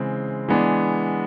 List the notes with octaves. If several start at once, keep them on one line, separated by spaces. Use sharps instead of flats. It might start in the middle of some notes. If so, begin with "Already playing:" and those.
Already playing: C#3 E3 G#3 C4
E3 G#3 B3 D4